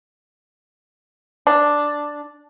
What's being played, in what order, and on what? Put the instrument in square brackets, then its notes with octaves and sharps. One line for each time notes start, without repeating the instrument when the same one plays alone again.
[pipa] D4